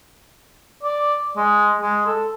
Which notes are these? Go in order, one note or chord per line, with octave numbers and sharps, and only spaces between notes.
D5
G#3
G#3
A4